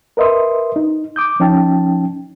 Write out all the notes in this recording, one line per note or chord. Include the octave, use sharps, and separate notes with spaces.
A#4 B4 D#5 E5 C6 D#6
D#4
D6 D#6 G6
F3 C#4 D#4 G5 A5